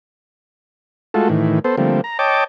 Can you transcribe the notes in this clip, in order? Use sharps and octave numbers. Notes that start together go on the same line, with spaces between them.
G#3 A3 F4 F#4 A4
A2 D#3 E3
B3 A4 C5
D3 F3 G3 A3 A#3 C4
A#5
C#5 D#5 G5 A5 D6